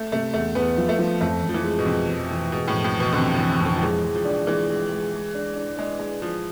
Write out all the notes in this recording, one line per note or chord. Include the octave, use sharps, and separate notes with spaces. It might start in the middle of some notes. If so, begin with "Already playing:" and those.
Already playing: A3
C3 A3
E2 A3
E2 B3
F3
A3
F3
F2 A3
F2
F3
E3
G#3
B2
F2 C3
F2
E3
B2 G#3
A2
F2
A2
B2 E3
D3
F2 C3
A2 E3
C3
F2 D3
F3
E3 G#3
G#3
F3
D4
E3 G#3
G#3
G#3
G#3
D4
D4
G#3 D4
G#3 G#4
F3 G#4